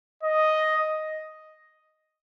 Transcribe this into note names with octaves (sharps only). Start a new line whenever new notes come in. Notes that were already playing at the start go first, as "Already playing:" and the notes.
D#5